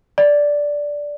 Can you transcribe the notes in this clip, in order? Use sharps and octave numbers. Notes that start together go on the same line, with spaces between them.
D5